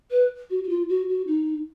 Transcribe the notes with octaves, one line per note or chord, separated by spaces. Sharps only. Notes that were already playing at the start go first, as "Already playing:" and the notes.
B4
F#4
F#4
F4
F#4
F#4
D#4